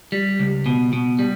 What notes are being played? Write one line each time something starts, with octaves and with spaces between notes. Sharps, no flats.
G3
C#2
B2
B2
G3